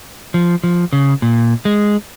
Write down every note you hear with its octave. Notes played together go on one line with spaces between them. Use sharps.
F3
F3
C#3
A#2
G#3